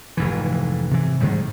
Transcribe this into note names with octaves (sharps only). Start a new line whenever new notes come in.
F1 G#2 E3
C3 E3
G#2 C3 D#3 G3